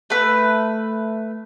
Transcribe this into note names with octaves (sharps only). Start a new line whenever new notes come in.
A3 B4